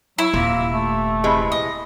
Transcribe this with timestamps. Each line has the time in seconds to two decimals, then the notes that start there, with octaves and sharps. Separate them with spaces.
0.18 F#3 E4
0.34 D#1 C3 A#3
0.73 A3
1.24 C3 E3 G#3
1.52 D#5